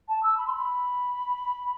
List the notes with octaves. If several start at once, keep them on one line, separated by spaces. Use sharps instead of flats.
A5
E6
B5
C6
B5